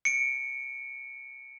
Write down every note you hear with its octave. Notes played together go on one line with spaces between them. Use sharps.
C#7 D7